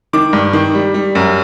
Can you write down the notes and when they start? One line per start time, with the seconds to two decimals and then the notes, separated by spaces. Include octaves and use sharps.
0.13 D#3 D6
0.33 G2
0.53 D#3
0.74 G3
0.94 G3
1.15 F#2